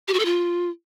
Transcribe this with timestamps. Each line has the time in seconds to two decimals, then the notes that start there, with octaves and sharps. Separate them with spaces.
0.08 G4
0.14 F#4
0.19 A4
0.25 F4